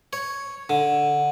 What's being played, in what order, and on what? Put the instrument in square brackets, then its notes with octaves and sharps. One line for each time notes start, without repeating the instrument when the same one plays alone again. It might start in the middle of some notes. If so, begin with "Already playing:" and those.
[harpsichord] C#5
D3